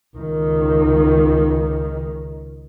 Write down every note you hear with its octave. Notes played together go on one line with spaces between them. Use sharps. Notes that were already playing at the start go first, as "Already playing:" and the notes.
C#2 D#3